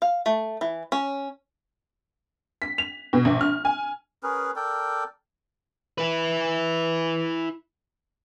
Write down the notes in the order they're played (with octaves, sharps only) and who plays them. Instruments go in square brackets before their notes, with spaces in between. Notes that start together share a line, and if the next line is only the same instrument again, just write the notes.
[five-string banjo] F5
A3
E3
C#4
[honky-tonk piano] B6
F7
B2
A#1
F6
G#5
[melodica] C#4 G#4 A#4 B4
A4 A#4 D5 G5
[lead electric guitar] E4 B4